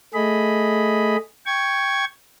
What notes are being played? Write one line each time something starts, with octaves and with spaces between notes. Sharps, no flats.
A3 G#4 D#5 B5
G5 C#6 G#6